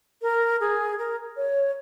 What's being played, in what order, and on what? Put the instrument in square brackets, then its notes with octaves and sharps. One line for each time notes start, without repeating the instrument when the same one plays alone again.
[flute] A#4
G#4
A#4
C#5